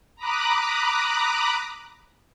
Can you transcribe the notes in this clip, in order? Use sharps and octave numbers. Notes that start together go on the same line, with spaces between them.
A#5 B5 D6 D#6 F#6